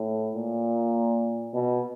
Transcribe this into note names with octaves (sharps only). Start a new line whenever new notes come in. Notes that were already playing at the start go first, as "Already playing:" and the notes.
Already playing: A2
A#2
B2